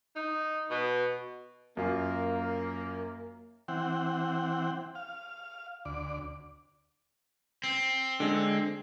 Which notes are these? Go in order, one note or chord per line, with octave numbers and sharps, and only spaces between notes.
D#4
B2
F#2 A#3 F4
E3 C4 F#5 G5
F5
D2 D5
C4
D3 G#3